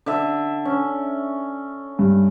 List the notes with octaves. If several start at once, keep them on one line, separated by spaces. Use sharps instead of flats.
D3 E5
C#4
G2